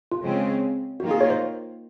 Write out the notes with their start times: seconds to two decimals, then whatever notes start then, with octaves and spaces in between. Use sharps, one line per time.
0.12 F4
0.22 C#3 G#3 C4
1.00 D#3 A#3 F4 F#4
1.11 G#4
1.21 C#5
1.30 C5